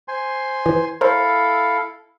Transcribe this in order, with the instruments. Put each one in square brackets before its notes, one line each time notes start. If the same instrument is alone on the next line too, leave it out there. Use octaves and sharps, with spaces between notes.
[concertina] C5 G#5 C6
[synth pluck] E3
[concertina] E4 A4 F5 [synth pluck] A#4 C5